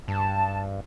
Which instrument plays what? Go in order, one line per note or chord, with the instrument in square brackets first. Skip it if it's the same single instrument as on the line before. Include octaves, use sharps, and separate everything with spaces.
[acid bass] G2 [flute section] A5